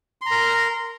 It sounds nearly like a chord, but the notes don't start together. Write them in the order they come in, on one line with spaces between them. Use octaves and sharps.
C6 A#5 A#4